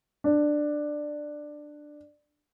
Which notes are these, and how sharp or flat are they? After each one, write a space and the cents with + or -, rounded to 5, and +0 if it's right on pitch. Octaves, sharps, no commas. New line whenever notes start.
D4 +10